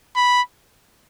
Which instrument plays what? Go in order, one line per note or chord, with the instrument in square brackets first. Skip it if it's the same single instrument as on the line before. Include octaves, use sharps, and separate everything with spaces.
[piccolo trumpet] B5